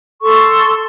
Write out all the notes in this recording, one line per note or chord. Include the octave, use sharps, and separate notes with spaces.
A4 C6 C#6